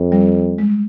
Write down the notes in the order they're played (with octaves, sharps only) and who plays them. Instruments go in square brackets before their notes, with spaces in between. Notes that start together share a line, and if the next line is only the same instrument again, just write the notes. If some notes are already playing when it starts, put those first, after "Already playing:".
Already playing: [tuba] F2
[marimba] G3
G#3